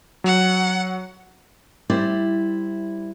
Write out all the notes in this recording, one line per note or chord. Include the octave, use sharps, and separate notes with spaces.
F#3 F#5
G3 E4 C5 D5